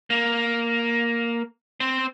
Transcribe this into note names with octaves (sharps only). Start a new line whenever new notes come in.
A#3
C4